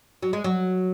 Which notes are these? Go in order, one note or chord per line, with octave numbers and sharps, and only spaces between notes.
F#3
G#3
F#3